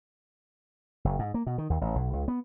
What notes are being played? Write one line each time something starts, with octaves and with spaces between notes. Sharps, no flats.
F#1
G#2
A#3
B2
D#3
D#2
A1
B1
C#2
B3